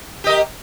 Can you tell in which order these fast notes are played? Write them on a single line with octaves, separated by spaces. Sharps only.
G4 D#5 A#4